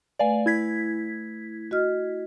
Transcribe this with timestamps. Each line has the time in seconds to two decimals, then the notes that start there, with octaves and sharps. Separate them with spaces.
0.19 A3 B4 D5 F5 G#5
0.46 E4 G#6 B6
1.71 F#4 D#5 F6